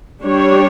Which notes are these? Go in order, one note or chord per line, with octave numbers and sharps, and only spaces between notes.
G3 D4 G4 C#5